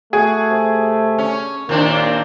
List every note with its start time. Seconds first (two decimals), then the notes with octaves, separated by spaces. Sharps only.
0.13 A3 F#4 G#4
0.50 C3
1.18 C#4
1.69 D#2 A#2 A#3 C4 D4